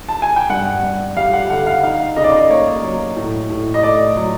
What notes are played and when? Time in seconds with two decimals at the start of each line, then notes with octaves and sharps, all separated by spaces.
0.09 A5
0.22 G#5
0.36 G5
0.50 G2 F#5
0.83 G2
1.17 G3 F5
1.33 F#5
1.49 D3 F#5
1.66 F5
1.83 D#4 F5
2.17 C#3 D#5
2.24 D5
2.32 D#5
2.50 A#3 C#5
2.83 F#3
3.17 A2
3.50 A2
3.74 D#5
3.83 A3 D5
4.17 F#3